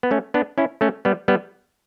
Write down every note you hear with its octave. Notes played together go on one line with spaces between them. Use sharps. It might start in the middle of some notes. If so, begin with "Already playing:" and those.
B3
A3 C#4
B3 D4
C#4 E4
A3 C#4
G3 B3
G3 B3